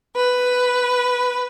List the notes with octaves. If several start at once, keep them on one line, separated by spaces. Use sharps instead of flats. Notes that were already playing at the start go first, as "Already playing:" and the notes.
B4